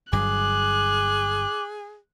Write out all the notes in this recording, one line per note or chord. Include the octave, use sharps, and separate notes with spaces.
G1 G2 F#3 G#4 D6 F#6